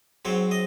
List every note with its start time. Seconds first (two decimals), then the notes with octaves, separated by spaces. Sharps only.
0.25 G#2 F#3 C4 C#5
0.51 D#5